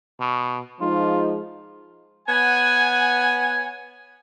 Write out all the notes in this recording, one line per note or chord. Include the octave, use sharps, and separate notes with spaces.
B2
F3 G#3 D#4 F4
B3 C#5 F#5 G#5